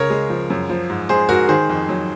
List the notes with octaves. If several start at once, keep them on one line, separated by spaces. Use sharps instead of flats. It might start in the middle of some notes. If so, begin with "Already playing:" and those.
Already playing: C#2 C#3 A#4 C#5
G#3
F3
F#2
F3
G#2
G#3 G#4 C5
G#2 F#4 A#4
D#3 G#4 C5
F2
F#3